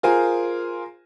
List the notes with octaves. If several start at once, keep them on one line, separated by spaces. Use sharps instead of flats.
F4 G#4 A#4 C5 G#5